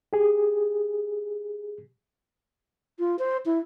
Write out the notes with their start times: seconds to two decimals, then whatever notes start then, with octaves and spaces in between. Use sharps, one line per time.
0.13 G4 G#4
2.99 F4
3.19 C5
3.46 E4